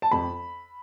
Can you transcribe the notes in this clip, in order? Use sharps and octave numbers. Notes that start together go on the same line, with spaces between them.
A5
F2 B5